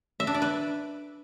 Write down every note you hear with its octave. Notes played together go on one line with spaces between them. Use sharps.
E5
D4
D5
B4